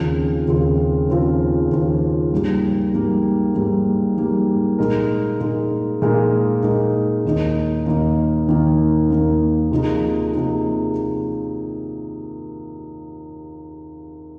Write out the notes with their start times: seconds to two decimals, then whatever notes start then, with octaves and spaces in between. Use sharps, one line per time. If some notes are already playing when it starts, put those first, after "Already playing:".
Already playing: D#2 C#3 F3 C4 F4
0.48 D#2 C#3 F3 C4 F4
1.09 D#2 C#3 F3 C4 F4
1.71 D#2 C#3 F3 C4 F4
2.32 G#2 G3 A#3
2.93 G#2 G3 A#3
3.55 G#2 G3 A#3
4.17 G#2 G3 A#3
4.78 A#2 G#3 D#4 A#4
5.40 A#2 G#3 D#4 A#4
6.02 A#2 G#3 D#4 A#4
6.63 A#2 G#3 D#4 A#4
7.25 D#2 D#3 A#3 D#4
7.86 D#2 D#3 A#3 D#4
8.48 D#2 D#3 A#3 D#4
9.09 D#2 D#3 A#3 D#4
9.71 C3 F3 A#3 D#4 G#4
10.33 C3 F3 A#3 D#4 G#4